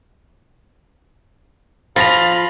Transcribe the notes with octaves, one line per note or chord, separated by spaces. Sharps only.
F3 F5 B5 A6 A#6 F7